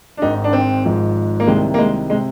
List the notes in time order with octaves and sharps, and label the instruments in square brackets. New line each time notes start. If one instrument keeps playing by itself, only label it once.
[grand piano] D4
G#1 G#2 D#3 D#4
D4
C4
G#1 G#2 F3
A#3
C2 C3 D#3 G#3
A#3
G#3
G#3
C3